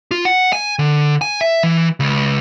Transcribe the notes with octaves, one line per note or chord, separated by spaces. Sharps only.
F4
F#5
G#5
D3
G#5
E5
E3
C#2